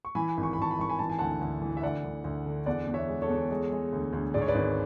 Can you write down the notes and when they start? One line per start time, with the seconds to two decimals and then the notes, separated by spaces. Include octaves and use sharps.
0.05 C#6
0.15 E3 G#5 B5
0.37 G#1
0.43 C#6
0.53 B5
0.58 G#1 A5 C#6
0.71 B5
0.79 G#1 C#6
0.89 G#5 B5
0.99 E3 A5
1.10 G#5
1.19 D2 F#5 A5
1.41 D2
1.62 E3
1.77 E5
1.83 D2 D5 F#5
2.04 D2
2.24 D2
2.46 D3
2.66 E2 D5 F#5
2.87 E2
2.94 C#5 E5
3.08 G#3
3.22 A4 C#5
3.29 E2
3.51 G#3
3.72 G#3
3.93 D2
4.13 D2
4.34 G#2 D5
4.42 C#5
4.48 B4 D5
4.55 G#1